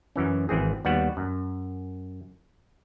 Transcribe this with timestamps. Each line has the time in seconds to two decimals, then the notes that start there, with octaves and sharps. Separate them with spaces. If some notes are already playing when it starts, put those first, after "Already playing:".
0.16 F#2 E3 C#4
0.49 G#1 E3 C4 G#4
0.85 D#2 G3 B3 F#4 F#5
1.17 F#2